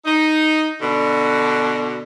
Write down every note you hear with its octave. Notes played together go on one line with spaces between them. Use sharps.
D#4
B2 D3